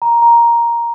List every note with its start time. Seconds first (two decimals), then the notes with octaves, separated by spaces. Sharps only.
0.02 A#5
0.22 A#5